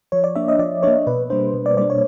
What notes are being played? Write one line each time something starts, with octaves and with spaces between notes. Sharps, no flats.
F3 C#5
D5
A#3 D4 E5
D#5
F3 D5
A#3 D4 C#5
B2 B4
G3 A#3 D4 C5
B2
D5
G3 A#3 D4 D5
C#5